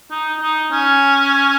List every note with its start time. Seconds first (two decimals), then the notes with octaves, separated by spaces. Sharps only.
0.11 D#4
0.42 D#4
0.72 C#4